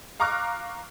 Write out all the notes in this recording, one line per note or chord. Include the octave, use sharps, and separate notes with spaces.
F5 A#5 C#6 D6 F6 F#6